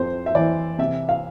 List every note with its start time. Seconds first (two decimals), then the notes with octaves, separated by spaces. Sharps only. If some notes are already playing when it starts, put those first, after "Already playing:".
Already playing: F2 C5
0.26 E5
0.35 E3 D5
0.79 C3 E5
1.09 F5